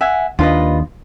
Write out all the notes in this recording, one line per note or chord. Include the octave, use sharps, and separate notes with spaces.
E5 F#5 G#5
D#2 D4 F4 B4 D#5